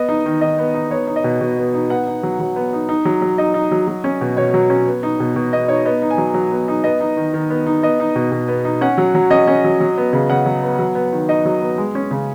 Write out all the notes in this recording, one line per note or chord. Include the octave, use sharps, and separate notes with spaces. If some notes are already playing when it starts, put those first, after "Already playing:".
Already playing: B3 D#5
D#4
D#3
D#3 D#5
B3
D#4
B3 C#5
D#4
D#5
B2
B2
B3
D#4
B3 F#5
D#4
F#3
F#3
B3
D#4
D#4
F#3
F#3
D#4 D#5
D#4
F#3
F#3
C#4
B2
B2 C#5
F#3
C#4
B3
D#4
B2
B2
B3 D#5
D#4 C#5
B3 D#5
D#4
G#5
F#3
F#3
B3
D#4
B3 D#5
D#4
D#3
D#3
B3
D#4
B3 D#5
D#4
B2
B2
B3
D#4
C#4 F#5
F#3
F#3
C#4 D#5
C#4
F#3
F#3
B3
C#3
C#3 F#5
F#3
B3
F#3
B3
D#3
D#4 D#5
F#3
B3
G#3
C#4
C#3